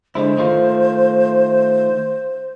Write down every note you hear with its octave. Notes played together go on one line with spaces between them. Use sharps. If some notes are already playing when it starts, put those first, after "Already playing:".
D3 G#3 E4 C5
D#3 A3 F4